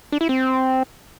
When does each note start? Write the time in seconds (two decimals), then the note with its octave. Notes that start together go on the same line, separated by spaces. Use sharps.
0.12 D4
0.21 E4
0.29 C4